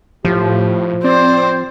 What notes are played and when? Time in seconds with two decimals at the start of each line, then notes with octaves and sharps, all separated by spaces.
0.25 A2 F3 G4
1.04 C4 C5 D5